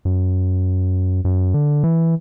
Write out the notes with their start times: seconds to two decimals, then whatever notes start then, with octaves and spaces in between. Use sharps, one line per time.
0.05 F#2
1.25 F#2
1.54 D3
1.84 E3